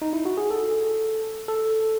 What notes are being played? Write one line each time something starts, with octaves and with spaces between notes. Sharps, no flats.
D#4
E4
F#4
G#4
A4
A4